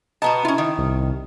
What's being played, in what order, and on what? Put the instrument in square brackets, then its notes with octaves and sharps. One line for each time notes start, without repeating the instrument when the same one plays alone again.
[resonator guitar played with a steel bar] B2 B3 A5 [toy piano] D#5 A#5
[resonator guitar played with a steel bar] C#4 F4 [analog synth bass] E4
[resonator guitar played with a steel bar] D#3
[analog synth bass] C2